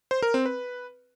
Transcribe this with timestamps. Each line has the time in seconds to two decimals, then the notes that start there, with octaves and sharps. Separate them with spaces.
0.11 C5
0.22 A#4
0.34 C4
0.46 B4